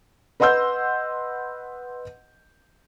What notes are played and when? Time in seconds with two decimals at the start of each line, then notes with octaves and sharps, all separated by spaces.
0.40 B4 D#5 F#5 C6 E6 G6